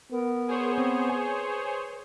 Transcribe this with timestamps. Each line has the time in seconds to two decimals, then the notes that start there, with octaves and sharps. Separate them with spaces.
0.11 B3 A#4
0.48 G#4 C5 C#5
0.78 C4 B4
1.09 G#5